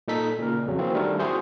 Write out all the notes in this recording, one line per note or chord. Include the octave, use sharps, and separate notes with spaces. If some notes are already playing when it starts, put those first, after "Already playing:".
A#2 D#4 A4 B6
A#2 C#3 A#4
F2 C#3 F#3
E3 A#3 C4 F#4
D#3 G3 A3 D4 A4 A#4
C4 E4 F#4 G#4 C5